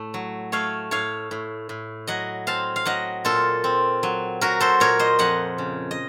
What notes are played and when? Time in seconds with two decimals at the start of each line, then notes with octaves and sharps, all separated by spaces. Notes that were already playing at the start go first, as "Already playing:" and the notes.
Already playing: A2 A3
0.14 F#3
0.52 A3 C#5 F5
0.91 A2 C#5 F5
1.31 A2
1.69 A2
2.07 F#3 D#5 F#5
2.47 C4 F5 A5
2.76 F5
2.85 F#3 D#5 F#5
3.25 A#2 F4 A4
3.64 C4
4.03 F#3
4.41 F#3 F#4 A#4
4.60 A4 C5
4.80 A#2 A#4 C#5
4.99 C5 D#5
5.19 F2 D#5 F#5
5.58 C#3
5.91 D#5